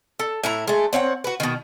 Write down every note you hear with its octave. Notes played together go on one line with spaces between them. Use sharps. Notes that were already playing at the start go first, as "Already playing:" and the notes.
A4
A2 E4 A#5
G#3 A3
C4 C#5 F5 F#5
F#4 B4
B2 D#3